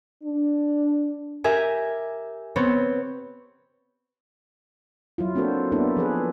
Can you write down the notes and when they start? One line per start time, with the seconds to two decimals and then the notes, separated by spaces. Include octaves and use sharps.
0.24 D4
1.44 G4 A#4 E5 G#5
2.56 B3 C4 C#5
5.18 F#3 E4 F4
5.35 A#3 C4 D4 F#4 A4 C5
5.72 A#3 B3 D4 E4 A4
5.97 F3 G#4 B4